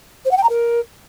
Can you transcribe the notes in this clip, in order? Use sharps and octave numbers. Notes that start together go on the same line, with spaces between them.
C5
F#5
G5
A#5
A#4